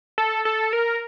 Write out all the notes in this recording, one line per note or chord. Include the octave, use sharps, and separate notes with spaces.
A4
A4
A#4